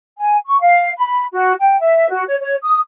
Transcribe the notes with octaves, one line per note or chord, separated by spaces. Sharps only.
G#5
C#6
F5
B5
F#4
G5
E5
F#4
C#5
C#5
D#6